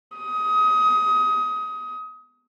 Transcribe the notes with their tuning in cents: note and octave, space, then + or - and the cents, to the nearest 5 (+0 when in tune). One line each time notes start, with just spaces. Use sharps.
D#6 +25